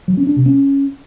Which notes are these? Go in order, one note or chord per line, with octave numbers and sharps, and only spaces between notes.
F#3
C#4
D4
C3
C#4